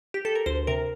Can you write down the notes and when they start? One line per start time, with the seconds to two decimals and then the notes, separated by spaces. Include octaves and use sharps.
0.14 G4
0.25 A4
0.35 A#4
0.46 D2 C5
0.67 C3 A#4